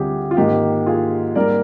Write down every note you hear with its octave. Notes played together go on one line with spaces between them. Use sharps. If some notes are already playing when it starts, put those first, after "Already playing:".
Already playing: D2 D3 G3 C4 F4 G4 G#4
F4
G#2 D#3 A#3 G4
F4 G#4
G#2 G3 A#3 A#4 D5